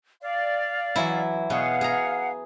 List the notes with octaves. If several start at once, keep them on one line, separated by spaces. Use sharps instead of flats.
D5 F5
E3 F#3 E4
B2 G#4 C#5 F5 F#5
G#4 A#5